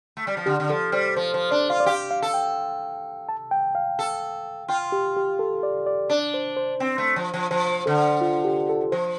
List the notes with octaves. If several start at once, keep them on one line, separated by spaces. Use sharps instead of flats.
A3
G3
F3
D3 G4
D3
F3 A4
G3 C5
F3 C5
F3 C5
D4 D5
F4 F5
D5
G4 F5
F5
A4
G5
A5
G5
F5
A4
F4 G5
G4
G4
A4
D5
D5
D4 D5
C5
C5
C4
A3
F3
F3
F3 C5
D3 A4
F4
G4
A4
F3 C5